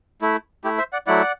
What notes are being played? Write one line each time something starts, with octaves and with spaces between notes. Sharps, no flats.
A3 E4
A3 E4 G4
C5 E5
D5 F#5
F#3 A3 E4 D5 F#5